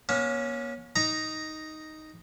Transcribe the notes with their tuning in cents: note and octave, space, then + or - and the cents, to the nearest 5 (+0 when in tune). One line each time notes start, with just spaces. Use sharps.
A#3 +45 C#4 +0
D#4 +0 A#5 +0